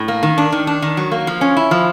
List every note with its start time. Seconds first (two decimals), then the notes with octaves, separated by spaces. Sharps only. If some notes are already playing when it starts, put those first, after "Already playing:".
Already playing: A2
0.08 A#3
0.23 D#3
0.38 D4
0.52 D#3
0.67 D4
0.82 D#3
0.97 F#3
1.12 A#3
1.27 F3
1.41 C#4
1.57 E4
1.71 F3